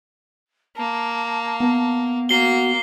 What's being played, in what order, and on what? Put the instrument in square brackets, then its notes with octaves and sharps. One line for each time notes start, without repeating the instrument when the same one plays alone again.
[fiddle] A#3 [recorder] A5
[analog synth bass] B3
[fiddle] A#3 [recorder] F#4 [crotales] C7 G7